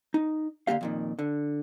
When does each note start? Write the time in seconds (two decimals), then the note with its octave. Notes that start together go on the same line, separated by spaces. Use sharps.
0.14 D#4
0.67 D3 D#3 A#3 G4 F5
0.81 F2 A#2 D#3
1.19 D3